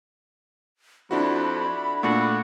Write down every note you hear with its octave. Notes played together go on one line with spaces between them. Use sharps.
F2 D4 E4 F#4 B5
A#2 A3 D4 F#4